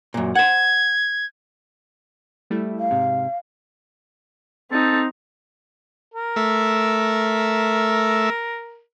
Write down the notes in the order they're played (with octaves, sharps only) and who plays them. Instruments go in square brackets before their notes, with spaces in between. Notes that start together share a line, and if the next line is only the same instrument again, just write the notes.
[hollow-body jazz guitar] F#2 A#2
[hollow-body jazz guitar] C5 F#5 [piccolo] G#6
[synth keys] G3 A3 E4
[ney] F5
[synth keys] G#2 C3
[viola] C4 D#4 [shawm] A4
[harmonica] A#4
[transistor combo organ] A3 E5